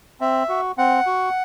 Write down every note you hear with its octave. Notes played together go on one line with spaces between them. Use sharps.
C4 E5
F#4
C4 F#5
F#4